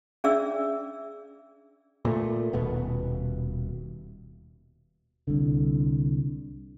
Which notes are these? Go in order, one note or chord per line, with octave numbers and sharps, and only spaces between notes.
C#4 D4 G#4 D5 E5 E6
A#2 A3
D#1 B2 B3
C2 D3